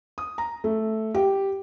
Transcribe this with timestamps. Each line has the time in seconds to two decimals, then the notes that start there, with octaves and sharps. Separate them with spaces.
0.18 D#6
0.38 A#5
0.64 A3
1.15 G4